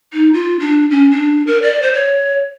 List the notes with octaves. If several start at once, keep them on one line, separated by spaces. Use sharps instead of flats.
D#4
F4
D4
C#4
D4
A#4
D5
C5
C#5